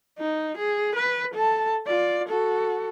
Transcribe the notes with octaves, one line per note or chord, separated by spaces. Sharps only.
D#4
G#4
B4
A4 A5
F4 D5
F#4 A4